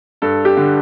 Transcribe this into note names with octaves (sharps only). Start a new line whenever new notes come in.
G2 A4
G4
D3